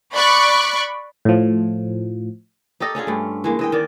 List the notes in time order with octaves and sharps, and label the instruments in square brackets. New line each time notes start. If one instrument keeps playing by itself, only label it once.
[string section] D5 B5 C#6 F#6
[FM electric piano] A2 F3
[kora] D#4 G4 A4 D#5
C#4 D4 F4 G#4
G2 A3
E3 G#3 A#3
E3 D#5 G5
D#3 D5